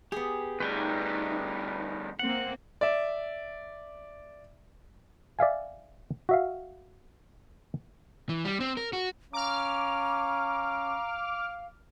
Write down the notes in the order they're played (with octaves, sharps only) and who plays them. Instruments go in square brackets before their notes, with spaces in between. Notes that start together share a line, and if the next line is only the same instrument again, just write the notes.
[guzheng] B3 G#4 [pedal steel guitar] G4
[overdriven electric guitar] D2 G3 [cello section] D#4 [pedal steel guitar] B4 G5 G#5
[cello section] A#3 C4 [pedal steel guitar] F#5
[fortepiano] D5 E5
[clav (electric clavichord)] D5 E5 F5 G#5
F#4 E5 F5
[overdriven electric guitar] E3
G3
C4
A#4
F#4
[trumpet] C#4 [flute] F5 [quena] A#5 [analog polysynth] D6 F6